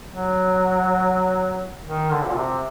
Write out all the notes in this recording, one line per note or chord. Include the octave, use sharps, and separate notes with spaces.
F#3
D#3
D3
A#2
C3